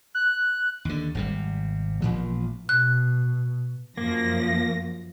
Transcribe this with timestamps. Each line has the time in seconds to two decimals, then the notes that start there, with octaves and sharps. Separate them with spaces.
0.15 F#6
0.85 D#2 D3
1.15 G#1 C3 G3
2.02 A1 A#2 F3
2.69 B2 F#6
3.97 F#2 F3 A#3 A#6